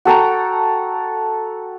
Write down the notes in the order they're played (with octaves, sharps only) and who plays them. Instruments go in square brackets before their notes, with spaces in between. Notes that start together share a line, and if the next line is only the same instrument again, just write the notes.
[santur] F#4 A4 G5 A#5